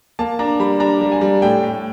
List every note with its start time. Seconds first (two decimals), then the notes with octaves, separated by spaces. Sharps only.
0.19 A#3 A5
0.39 D4 A#5
0.60 G3 B5
0.80 D4 A#5
1.01 G3
1.12 G#5
1.21 G3
1.42 A2 G5
1.63 A2